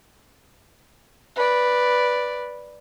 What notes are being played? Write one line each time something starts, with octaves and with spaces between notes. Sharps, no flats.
B4 D5